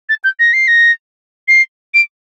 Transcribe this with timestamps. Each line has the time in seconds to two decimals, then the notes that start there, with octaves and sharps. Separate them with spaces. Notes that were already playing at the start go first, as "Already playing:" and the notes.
0.09 A6
0.24 G6
0.39 A#6
0.53 C7
0.68 A#6
1.48 C7
1.94 D7